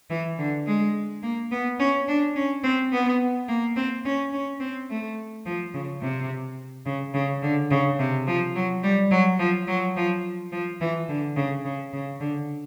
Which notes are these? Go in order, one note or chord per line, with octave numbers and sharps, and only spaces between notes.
E3
D3
G#3
A#3
B3
C#4
D4
C#4
C4
B3
A#3
C4
C#4
C#4
C4
A3
F3
C#3
C3
C#3
C#3
D3
C#3
C3
F3
F#3
G3
F#3
F3
F#3
F3
F3
E3
D3
C#3
C#3
C#3
D3